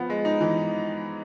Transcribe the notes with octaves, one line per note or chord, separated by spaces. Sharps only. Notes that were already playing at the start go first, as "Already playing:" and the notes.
Already playing: F3 B3
G#3
D#4
E3